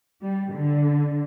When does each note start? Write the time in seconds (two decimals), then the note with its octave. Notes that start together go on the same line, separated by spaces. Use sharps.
0.22 G3
0.53 D3